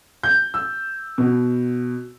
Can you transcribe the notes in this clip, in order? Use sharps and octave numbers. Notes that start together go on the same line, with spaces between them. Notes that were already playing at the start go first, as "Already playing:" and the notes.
G6
E6
B2